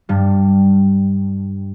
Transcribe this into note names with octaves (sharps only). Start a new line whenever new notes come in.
G2 G3